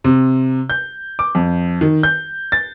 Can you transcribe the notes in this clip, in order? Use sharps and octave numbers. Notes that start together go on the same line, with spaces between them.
C3
G6
D6
F2
D#3
G6
A6